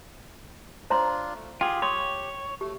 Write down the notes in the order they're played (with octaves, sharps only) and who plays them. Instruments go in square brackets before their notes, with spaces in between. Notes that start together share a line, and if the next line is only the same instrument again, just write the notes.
[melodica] D4 F4 [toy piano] C5 A#5 C6
[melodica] A3
[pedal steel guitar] F4 G#4 [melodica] G4 [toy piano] G5
[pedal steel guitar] C#5 [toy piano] C6 D#6
[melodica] A3 [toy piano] G4